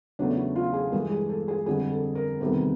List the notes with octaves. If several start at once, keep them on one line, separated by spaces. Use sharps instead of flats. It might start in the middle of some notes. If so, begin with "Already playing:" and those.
E2 C#3 F#3 A3 D4
E4
F4
G#4
G2 E3 G#3 A4
G#4
A4
G#4
F2 D3 G3 G#4
A4
A#4
E2 C3 D#3 G3 A4